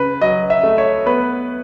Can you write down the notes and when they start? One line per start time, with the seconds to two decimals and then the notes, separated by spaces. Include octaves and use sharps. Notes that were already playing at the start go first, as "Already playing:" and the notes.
Already playing: C#3 B4
0.21 F#3 D#5
0.50 E5
0.63 A3
0.78 C#5
1.06 B3 B4